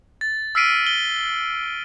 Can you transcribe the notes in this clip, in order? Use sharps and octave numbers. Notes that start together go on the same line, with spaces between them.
A6
E6 F6 B6 C7 D7 D#7
G7